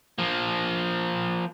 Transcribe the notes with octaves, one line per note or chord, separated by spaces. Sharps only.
F3 A#3